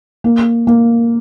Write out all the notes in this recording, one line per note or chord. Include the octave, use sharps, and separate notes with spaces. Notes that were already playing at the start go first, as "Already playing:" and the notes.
A#3
A#3